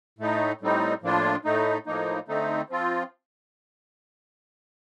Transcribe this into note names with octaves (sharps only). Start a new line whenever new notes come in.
A2 A3 D#4
A2 G3 C4 D#4
A2 F3 A#3 D4 F4
A2 A3 D#4
A2 F3 A#3 D#4
D3 A3 C4 D#4
F3 C4 F4